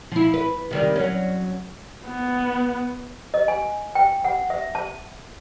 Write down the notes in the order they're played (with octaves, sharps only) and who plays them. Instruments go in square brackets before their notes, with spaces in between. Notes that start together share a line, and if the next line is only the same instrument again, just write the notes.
[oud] F3 E4
B4
C3 D#3 G3
F#3 C#4
[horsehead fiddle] B3
[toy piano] D#5
G#5
G5
F#5
E5
A5